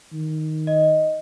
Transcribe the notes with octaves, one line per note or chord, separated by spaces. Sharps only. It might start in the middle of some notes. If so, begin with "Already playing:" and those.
D#3
D#5